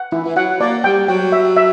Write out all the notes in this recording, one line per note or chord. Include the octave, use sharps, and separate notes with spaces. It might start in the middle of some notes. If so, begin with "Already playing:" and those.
Already playing: F#5
E3 E4
E3
F#3 F#5
A#3 D5
G3 G5
F#3 G5
E5
E5